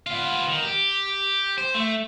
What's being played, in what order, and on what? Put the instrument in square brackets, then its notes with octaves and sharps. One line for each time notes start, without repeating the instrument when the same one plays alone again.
[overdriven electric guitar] B3 F4
D#3
G4
C5
A3